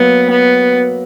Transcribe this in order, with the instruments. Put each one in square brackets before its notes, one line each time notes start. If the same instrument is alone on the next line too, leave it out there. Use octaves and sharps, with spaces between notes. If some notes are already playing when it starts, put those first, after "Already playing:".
Already playing: [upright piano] F#3 A#3 [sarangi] B3
[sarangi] B3